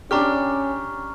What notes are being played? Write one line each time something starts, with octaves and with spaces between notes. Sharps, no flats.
C#4 D4 G4 A#5 C#6 F6